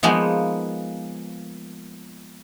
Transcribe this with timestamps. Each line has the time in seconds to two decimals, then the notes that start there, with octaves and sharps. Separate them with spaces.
0.03 F3 G#3 A#3 B3 D#4